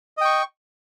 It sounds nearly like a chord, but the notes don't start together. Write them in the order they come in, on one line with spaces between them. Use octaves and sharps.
D#5 G5 C#6